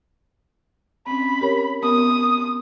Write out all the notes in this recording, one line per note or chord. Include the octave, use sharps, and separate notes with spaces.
C4 C#4 B5
G4 A#4 C#5
B3 A#4 D#6